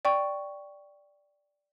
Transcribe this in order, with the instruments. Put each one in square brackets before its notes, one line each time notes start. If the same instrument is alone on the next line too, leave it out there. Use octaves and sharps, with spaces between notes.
[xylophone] D5 G5 C#6